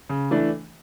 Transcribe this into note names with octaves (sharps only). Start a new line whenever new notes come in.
C#3
E3 A3 D4